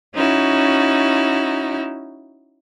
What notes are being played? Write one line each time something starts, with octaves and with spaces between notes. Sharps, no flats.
C#4 D#4 E4 F#4